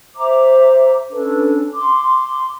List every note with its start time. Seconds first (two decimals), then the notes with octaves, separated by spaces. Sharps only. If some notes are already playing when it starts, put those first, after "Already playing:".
0.15 C5 E5 A#5 D6
1.11 C#4 D4 A4 B4
1.73 C6 D6